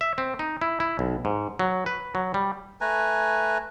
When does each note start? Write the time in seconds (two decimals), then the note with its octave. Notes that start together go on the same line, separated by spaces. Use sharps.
0.01 E5
0.18 C4
0.39 D#4
0.61 E4
0.80 E4
0.99 B1
1.25 G#2
1.59 F#3
1.86 B4
2.15 F#3
2.34 G3
2.81 A3 B4 G#5 A#5